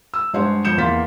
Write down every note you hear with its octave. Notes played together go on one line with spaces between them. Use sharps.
E6
G2 G#3 C5 C#5 F#5 C6
G1 F2 C5 G6 C#7 E7
E2 A#3 F5 C6 A6 B6